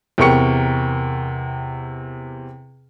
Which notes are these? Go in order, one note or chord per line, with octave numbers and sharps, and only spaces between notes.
E2 C3 A#4 G5 C#6 C#7